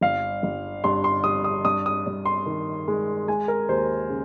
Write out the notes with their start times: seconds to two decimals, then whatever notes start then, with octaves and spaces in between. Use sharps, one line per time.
0.01 G1 F5
0.43 G1
0.84 G2 C6
1.04 C6
1.24 G3 D#6
1.44 D#6
1.65 G2 D#6
1.86 D#6
2.06 G2
2.25 C6
2.46 D#3
2.88 G#3
3.28 G#3 G#5
3.48 A#4
3.69 D#2 C5
4.10 C#3